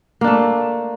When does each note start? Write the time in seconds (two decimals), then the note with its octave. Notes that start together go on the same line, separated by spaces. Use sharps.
0.21 A#3
0.24 D4
0.27 A3